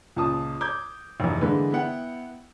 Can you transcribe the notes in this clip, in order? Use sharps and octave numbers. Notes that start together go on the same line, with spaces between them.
C#2 A#2 A5 D#6
D6 G6 G#6
F1 E2
D3 E3 G#3 A#3 B4
B3 E4 F#5 G5